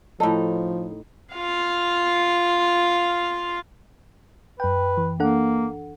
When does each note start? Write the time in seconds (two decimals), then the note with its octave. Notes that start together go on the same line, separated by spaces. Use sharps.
0.20 A2 F3 D#4 A4
1.35 F4 F5
4.60 F#2 B4 G5
4.97 E3
5.20 A#3 D4 A4 F#5